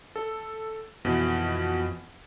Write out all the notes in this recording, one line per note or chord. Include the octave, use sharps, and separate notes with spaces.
A4
F2 B2 E3